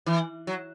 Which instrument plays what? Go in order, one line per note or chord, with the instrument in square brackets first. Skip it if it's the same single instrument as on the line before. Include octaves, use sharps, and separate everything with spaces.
[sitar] E3
F#3